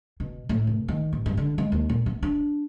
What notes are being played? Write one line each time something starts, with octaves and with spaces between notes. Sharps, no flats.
B2
A2
F1
D#3
A1
G2
D3
G#3
D#2
A#2
B3
D4